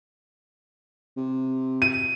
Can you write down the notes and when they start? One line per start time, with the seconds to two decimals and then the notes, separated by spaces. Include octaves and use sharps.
1.17 C3
1.82 D#7